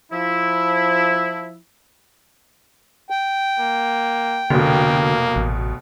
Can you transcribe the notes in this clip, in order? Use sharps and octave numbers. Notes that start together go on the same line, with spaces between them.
F3 E4
G5
A#3
F1 B2 D3 A#3
A1